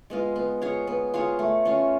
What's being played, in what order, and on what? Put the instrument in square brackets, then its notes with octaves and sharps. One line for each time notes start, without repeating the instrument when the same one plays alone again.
[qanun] G#3 B3 F4
B3
F4 G#4 C#5
B3
F4 G#4 C#5
A3
C#4 F4